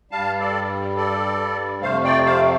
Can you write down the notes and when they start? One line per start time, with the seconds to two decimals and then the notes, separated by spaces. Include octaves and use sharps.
0.11 G2 G3 F5 A5
0.40 A4 D5
0.97 A4 D5
1.82 F2 C3 A3 C5 F5
2.04 D5 G5
2.25 C5 F5